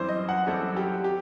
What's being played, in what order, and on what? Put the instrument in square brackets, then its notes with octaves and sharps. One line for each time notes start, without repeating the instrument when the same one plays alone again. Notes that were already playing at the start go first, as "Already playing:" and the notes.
Already playing: [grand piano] F#2 E3 G3 C4 E4 [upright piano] C5
[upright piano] D#5
F#5
[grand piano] F#2 E3 G3 C4 E4 [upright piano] A4
[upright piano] G4
G4